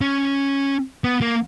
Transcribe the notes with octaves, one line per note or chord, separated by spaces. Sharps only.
C#4
B3
A#3